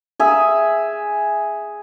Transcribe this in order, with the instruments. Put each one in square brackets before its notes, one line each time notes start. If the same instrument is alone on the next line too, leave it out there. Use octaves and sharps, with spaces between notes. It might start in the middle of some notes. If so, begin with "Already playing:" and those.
[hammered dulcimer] G#4 E5